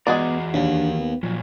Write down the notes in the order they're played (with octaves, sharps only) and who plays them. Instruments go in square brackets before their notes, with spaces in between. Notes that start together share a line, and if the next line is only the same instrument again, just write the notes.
[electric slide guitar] E3 G#4 A#5 [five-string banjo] G#3 F#4 D5 [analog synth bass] B3
[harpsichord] D#2 [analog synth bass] D4
[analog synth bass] B3
[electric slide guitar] A#2 F#3 [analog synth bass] F3